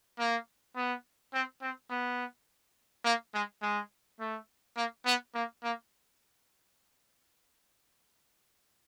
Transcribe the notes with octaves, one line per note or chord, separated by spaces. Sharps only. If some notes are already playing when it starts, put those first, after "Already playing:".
A#3
B3
C4
C4
B3
A#3
G#3
G#3
A3
A#3
B3
A#3
A#3